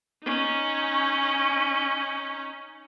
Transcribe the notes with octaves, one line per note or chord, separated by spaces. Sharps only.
C#4 D#4